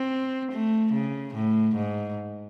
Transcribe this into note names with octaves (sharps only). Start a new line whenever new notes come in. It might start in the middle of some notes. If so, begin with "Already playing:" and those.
Already playing: C4
A3
C#3
A2
G#2